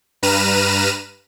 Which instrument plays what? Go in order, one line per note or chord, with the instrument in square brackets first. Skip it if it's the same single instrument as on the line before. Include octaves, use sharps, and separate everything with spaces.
[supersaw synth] G2 B4 A#5 F6 D#7 E7